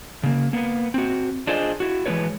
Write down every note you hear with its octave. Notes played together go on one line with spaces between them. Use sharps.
C#3 A#3
A#3 B3
C4 F#4
D4 F4 G#4 C5 D5 D#5
E4 F#4
E3 G#3 C4 G4 B4 C#5